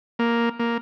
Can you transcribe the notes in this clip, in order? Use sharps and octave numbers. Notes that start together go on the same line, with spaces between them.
A#3
A#3